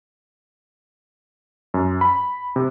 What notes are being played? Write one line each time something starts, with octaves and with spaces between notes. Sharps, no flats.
F#2
B5
C3